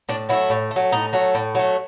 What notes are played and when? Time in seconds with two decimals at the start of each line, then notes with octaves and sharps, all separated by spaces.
0.09 A2 D4
0.29 F#3 A3 E4
0.50 A2
0.71 A3
0.76 F#3
0.92 A2 D#4
1.13 F#3 A3
1.35 A2
1.55 F#3 A3